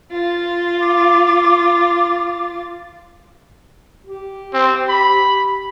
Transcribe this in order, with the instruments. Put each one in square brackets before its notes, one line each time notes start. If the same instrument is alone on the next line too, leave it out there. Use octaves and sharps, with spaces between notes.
[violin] F4 A6
[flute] D6
[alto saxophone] G4
[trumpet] C4
B5